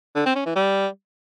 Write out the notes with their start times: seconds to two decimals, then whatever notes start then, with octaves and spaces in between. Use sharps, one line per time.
0.15 D3
0.25 C4
0.36 C#4
0.46 E3
0.56 G3